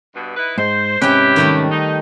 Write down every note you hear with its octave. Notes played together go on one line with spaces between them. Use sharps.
G2 B2
D#4 E4 B4
G#2 C5
G#2 C3 C#4 E4 G4 B4 G5
D#3 G3 A3
D#4